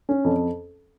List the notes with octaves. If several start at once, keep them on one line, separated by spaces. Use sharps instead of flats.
C#4
F2